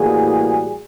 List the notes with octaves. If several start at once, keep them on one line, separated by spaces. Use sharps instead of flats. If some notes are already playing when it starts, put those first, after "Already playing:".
Already playing: A2 E3 G3 A#3 F#4 G#4